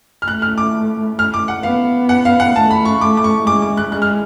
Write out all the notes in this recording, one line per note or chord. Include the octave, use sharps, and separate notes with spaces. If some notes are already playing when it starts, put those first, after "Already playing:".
F6
A3 F#6
F6
D6
F6
D6
F#5
B3 F5
F#5
F5
F#5
A3 A5
B5
C#6
A3 D6
D6
C#6
G#3 D6
D6
F#6
G#3 F#6
F6